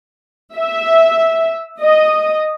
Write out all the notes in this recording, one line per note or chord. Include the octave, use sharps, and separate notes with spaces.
E5
D#5